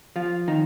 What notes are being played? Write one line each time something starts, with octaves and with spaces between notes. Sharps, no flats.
F3 F4
D#3 D#4